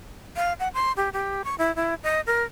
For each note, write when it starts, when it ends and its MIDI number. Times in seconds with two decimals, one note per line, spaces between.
0.36 0.53 77
0.60 0.68 78
0.74 0.92 84
0.97 1.09 67
1.13 1.42 67
1.44 1.55 85
1.59 1.74 64
1.76 1.94 64
2.03 2.21 75
2.27 2.44 70